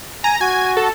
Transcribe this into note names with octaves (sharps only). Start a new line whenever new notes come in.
G#5 A#5
F#4 G#5
A4